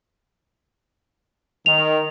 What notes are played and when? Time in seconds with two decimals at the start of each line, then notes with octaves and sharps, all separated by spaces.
1.66 D#3 F7